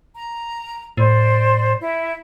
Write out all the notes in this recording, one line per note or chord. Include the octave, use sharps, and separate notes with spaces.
A#5
A2 C5 D5
E4 E5